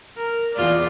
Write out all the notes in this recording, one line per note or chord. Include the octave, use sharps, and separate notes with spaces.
A#4
E2 F4 D5